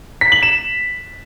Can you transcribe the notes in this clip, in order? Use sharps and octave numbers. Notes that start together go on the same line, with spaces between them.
B6
F#7
E7